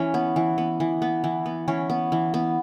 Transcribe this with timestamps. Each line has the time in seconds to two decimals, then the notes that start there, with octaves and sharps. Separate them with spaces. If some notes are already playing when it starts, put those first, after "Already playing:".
Already playing: E3 C#4
0.14 B3
0.36 E3
0.58 B3
0.80 E3
1.02 B3
1.24 E3
1.46 B3
1.68 E3 C#4
1.90 B3
2.12 E3
2.34 B3